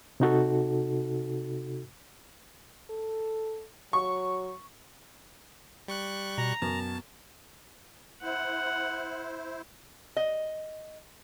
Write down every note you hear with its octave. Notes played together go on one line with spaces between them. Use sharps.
C3 D#4 F#4 A4
A4
F#3 C#6
G3 C#6 F#6
B2 A#5
F#2 B2 A5
E4 C5 F#5
D#5